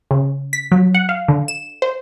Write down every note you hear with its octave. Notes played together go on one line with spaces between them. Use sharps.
C#3
B6
F#3
F#5
F5
D3
E7
C5